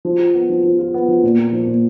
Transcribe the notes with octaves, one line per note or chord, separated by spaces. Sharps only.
F3
F4
B3
F3
F3
F4
B3
F3
A#2
A#3
F3
A#2